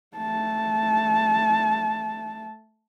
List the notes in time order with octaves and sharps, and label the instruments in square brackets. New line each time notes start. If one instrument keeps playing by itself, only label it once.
[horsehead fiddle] A3 A5